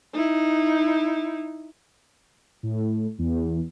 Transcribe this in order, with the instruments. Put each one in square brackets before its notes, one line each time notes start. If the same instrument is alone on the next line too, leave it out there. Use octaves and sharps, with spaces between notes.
[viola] D#4 E4
[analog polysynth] A2
E2